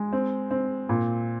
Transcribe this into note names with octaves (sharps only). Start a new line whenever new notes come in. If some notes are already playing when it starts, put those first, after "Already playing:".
Already playing: G#3
C4
C4
A#2